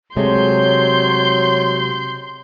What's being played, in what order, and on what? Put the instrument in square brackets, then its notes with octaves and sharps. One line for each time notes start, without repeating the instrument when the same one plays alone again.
[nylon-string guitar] C3 G#3 A3 [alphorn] F#3 [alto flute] C#5 [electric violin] C6 G6